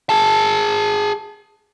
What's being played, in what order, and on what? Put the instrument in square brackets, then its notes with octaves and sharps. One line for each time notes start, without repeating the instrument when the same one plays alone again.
[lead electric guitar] G#4 A5